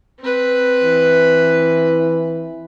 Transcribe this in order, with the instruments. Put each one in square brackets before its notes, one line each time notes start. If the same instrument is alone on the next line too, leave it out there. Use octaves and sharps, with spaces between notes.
[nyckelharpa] C4 B4
[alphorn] E3